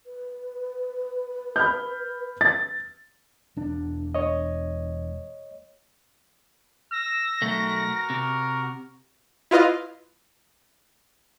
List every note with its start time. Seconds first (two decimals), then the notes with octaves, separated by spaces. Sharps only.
0.06 B4
1.56 B5 F6 G6
2.41 A6
3.56 E1 D4
4.15 C#5 D#5
6.92 E6 A#6
7.42 B1 A3 F#4 A#4 F#5
8.10 C3 A#4
9.51 E4 F4 B4 D#5 F5